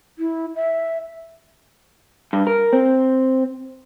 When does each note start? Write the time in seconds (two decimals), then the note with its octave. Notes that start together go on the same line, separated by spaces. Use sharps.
0.19 E4
0.55 E5
2.33 G2
2.47 A#4
2.73 C4